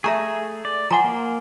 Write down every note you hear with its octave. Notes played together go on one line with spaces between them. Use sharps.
A3 G#4 E5 A#5 C#6
D5
F3 F#5 G#5 A#5 C6
A#3